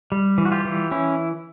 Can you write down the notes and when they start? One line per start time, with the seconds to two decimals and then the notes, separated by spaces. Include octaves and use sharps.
0.12 G3
0.38 E3
0.45 F#4
0.51 F4 G4
0.65 E3
0.91 C#4 E4